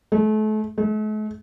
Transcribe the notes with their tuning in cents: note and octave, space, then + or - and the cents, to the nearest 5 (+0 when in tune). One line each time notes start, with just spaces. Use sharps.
A3 -35
A3 -45